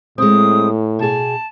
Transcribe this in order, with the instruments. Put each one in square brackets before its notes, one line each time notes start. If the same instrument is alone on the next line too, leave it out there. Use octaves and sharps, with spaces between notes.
[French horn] A2 [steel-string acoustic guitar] G#3 C4 [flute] D#6
[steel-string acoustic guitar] B2 G#4 [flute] A5